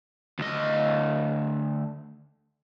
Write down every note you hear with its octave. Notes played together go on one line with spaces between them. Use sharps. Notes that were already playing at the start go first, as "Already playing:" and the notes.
D2 D#5